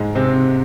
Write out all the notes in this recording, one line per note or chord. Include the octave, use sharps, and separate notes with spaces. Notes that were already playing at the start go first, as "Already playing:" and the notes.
Already playing: G#2 G#3
C3 C4